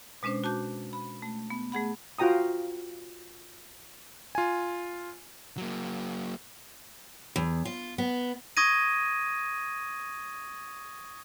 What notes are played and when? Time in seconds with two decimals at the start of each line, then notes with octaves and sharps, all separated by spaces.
0.23 B2 G#3 C#4 D4 C5
0.44 F#4 A5 D6 G6
0.93 B5
1.22 A3
1.50 B3
1.72 A3 G#4 F#5 B5
2.19 F4 F#4 G5 A#5 D#6
4.35 F4 G#5
5.57 F#3 A#3
7.36 E2
7.65 F4
7.98 B3
8.57 C#6 D#6 G#6 A#6 D#7